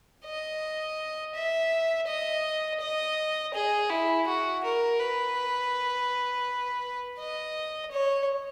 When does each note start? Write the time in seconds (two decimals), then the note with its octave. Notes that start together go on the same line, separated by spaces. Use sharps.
0.25 D#5
1.35 E5
2.07 D#5
2.80 D#5
3.54 G#4
3.90 E4
4.27 F#4
4.64 A#4
5.00 B4
7.19 D#5
7.91 C#5